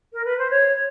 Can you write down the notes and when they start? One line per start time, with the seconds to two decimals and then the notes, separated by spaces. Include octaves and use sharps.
0.13 A#4
0.24 B4
0.38 C5
0.50 C#5